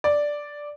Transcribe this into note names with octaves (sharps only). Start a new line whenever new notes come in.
D5